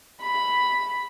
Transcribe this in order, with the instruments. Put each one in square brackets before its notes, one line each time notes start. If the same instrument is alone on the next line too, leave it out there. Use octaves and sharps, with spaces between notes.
[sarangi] B5